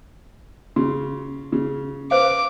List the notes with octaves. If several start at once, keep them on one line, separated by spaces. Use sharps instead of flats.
C#3 F#4
C#3
B4 C5 F5 D6